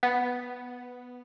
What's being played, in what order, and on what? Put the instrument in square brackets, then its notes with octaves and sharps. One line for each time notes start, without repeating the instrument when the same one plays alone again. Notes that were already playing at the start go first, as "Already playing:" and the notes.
[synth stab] B3